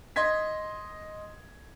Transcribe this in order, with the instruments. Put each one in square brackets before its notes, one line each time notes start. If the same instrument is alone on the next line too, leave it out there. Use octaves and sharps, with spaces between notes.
[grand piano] D#5 C6 G#6 B6